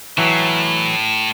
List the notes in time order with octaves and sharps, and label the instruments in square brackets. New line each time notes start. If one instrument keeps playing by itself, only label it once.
[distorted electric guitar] A2 [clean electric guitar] E3 F#3